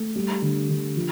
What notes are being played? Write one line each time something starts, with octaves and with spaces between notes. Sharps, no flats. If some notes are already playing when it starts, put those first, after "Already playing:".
Already playing: A3
G3
D3
D3
F3